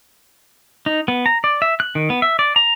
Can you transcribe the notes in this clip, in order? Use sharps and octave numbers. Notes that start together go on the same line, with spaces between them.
D#4
B3
A#5
D5
E5
F#6
D#3
B3
E5
D5
A#5